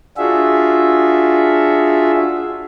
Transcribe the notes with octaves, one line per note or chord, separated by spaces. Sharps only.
D4 F4 F#4 G#4 E5